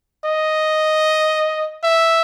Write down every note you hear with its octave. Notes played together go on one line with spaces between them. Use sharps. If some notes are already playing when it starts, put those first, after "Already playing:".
D#5
E5